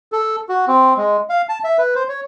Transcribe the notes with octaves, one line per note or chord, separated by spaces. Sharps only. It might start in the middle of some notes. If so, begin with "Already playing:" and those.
A4
F#4
C4
G#3
F5
A5
E5
B4
C5
C#5